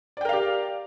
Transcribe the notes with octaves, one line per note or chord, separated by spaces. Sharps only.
G4 A#4 D5 F5 G5